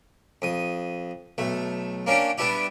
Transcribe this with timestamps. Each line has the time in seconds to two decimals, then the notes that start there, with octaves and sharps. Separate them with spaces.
0.42 F2 D#6
1.38 B1 A3
2.07 A#3 C#4 D4 G4
2.38 G3 B3 D4 E4 G4